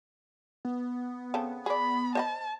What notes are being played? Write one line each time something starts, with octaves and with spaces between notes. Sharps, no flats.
B3
C#3 C4 A4
G#4 D5 B5
C5 D#5 A5 B5